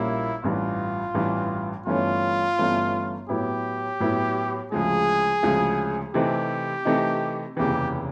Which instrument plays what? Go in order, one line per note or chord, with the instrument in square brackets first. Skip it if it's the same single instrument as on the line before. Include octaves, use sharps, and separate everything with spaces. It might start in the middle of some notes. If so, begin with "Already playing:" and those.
Already playing: [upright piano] A#1 A#2 G3 A#3 C#4 [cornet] E4
[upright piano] A1 G2 E3 [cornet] F4
[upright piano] A1 G2 E3
[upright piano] G1 G2 E3 A3 C#4 [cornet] F4
[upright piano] G1 G2 E3 A3 C#4
[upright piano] A2 F#3 B3 E4 [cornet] G4
[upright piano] A2 F#3 B3 E4
[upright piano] D2 C#3 F3 G#3 [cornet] G#4
[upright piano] D2 C#3 F3 G#3
[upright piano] C3 E3 A3 C4 D#4 [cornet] G4
[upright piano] C3 E3 A3 C4 D#4
[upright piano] F1 D#2 C#3 E3 [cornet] G4